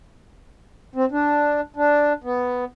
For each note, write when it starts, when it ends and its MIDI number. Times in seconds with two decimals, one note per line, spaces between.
0.96 1.05 60
1.12 1.61 62
1.76 2.13 62
2.24 2.65 59